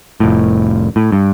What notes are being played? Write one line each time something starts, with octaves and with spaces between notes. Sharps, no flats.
F1 A2
A2
G2